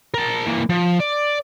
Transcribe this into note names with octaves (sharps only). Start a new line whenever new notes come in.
A#4 A5
E3 A#3
F3
D5